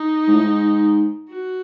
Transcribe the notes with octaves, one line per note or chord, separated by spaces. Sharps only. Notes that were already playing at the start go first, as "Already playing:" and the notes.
Already playing: D#4
G#2
A2
G#2
F#4